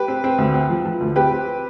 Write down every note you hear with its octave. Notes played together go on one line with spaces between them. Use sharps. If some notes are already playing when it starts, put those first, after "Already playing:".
Already playing: G4 B4
C4
C4
D2
C4
F3
F3
D2
C4 G4 B4
C4